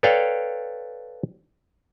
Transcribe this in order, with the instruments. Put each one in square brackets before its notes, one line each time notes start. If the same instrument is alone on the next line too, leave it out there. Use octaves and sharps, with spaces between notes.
[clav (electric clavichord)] A4 B4 C#5 D5 F5 G5